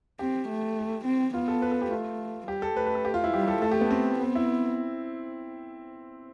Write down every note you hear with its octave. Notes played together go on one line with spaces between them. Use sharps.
C4 G4
A3
C4
B3 F4
A4
B4
A4
G4
A3 F4
G3 G4
A4
A3 B4
B4
A4
G4
F4
E4
G3 G4
A4
A3 A4
G4
B3
C4
B3
E4